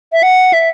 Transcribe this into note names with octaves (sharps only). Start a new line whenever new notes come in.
E5
F#5
E5